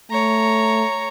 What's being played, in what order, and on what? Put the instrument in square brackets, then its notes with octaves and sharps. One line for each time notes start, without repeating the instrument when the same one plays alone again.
[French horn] A3 [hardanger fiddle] C#5 A#5